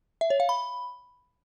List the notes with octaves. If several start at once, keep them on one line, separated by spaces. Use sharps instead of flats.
E5
C#5
F5
B5